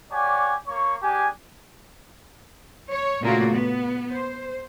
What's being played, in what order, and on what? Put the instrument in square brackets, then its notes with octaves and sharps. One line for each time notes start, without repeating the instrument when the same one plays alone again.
[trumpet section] G4 C#5 D5 F#5 G#5
A#3 C#5 C#6
D4 G4 G#4 G#5
[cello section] C#5
A#2 C#3 A3 A#3 F4 F#4
B3
C5